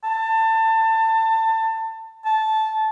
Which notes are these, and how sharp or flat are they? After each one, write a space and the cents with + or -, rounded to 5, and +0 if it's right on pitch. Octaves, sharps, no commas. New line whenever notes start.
A5 +25
A5 -15